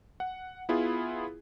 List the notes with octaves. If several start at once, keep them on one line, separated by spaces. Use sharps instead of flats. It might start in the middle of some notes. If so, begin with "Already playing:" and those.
F#5
B3 E4 F4 G#4